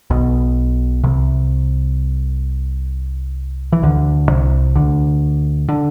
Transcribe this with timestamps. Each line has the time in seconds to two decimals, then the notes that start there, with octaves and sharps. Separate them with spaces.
0.10 B1 B2
1.04 C2 C3
3.72 E3
3.83 D2 D3
4.29 C2 C3
4.75 D2 D3
5.69 D3